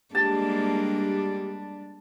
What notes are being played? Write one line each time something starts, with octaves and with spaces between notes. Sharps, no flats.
G3 G#3 A#3 D4 G4 A5